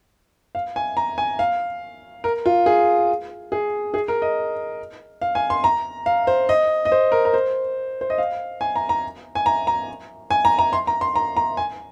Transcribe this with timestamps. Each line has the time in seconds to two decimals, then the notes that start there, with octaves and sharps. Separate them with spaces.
0.55 F5
0.76 G#5
0.97 A#5
1.18 G#5
1.39 F5
2.24 A#4
2.46 F4
2.66 G#4
3.52 G#4
3.94 G#4
4.08 A#4
4.22 D#5
5.22 F5
5.35 G#5
5.50 C6
5.64 A#5
6.06 F5
6.27 C5
6.49 D#5
6.85 D#5
6.92 C5
7.12 A#4
7.25 A#4
7.34 C5
8.01 C5
8.10 D#5
8.18 F5
8.61 G#5
8.76 A#5
8.89 A#5
9.35 G#5
9.46 A#5
9.67 A#5
10.30 G#5
10.45 A#5
10.59 A#5
10.73 C6
10.87 A#5
11.01 C6
11.16 A#5
11.37 A#5
11.57 G#5